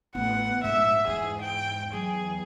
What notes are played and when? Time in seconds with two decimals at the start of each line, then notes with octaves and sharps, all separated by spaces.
0.15 A1 B3 F#5
0.64 A#1 G#2 G#3 E5
1.07 E2 G#4
1.42 G5
1.93 E2 F#3 G#4